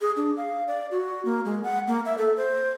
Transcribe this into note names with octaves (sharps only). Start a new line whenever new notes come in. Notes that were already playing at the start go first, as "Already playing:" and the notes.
G#4
D4
F5
D5
F#4
A#3
G#3
F#5
A#3
E5
A4
C5